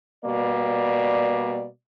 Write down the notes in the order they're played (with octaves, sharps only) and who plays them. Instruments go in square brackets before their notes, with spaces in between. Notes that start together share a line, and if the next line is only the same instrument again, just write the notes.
[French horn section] B2 G3 A#3 D5